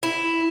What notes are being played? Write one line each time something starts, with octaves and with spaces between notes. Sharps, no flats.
E4